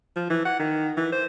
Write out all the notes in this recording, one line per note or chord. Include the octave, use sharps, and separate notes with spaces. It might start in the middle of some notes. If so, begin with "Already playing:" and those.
F3
E3
F#5
D#3
E3
C5